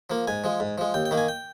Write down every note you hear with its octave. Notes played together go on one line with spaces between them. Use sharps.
F3 A#3
G#2 G#5
F3 G#3
G#2
F3 G#3
D#2 G5
G5
D#3 A#3
G#5
G5